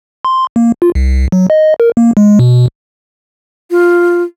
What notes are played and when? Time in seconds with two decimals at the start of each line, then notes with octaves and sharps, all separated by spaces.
0.25 C6
0.56 A#3
0.82 F4
0.95 C2
1.32 F#3
1.50 D#5
1.80 A#4
1.97 A#3
2.17 G#3
2.39 B2
3.71 F4